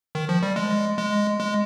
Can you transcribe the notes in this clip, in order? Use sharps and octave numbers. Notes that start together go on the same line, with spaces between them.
D#3
F3
G3
G#3
G#3
G#3